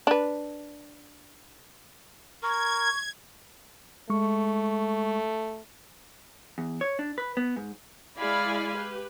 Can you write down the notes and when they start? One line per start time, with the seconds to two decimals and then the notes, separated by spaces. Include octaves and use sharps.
0.07 D4 B4
2.43 A#4 C#6 G#6
4.10 G#3 A3 C#6
6.58 E2
6.81 C#5
6.99 D4
7.18 B4
7.37 B3
7.56 G#2
8.18 G#3 E4 D5 F5 G#5 B5
8.76 G4 B4